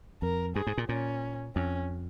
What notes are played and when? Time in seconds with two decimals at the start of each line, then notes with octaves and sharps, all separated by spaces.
0.22 F2 A#4
0.56 G2 G#4
0.67 G#2
0.78 A#2
0.89 A#2 C#4
1.56 F2 C#4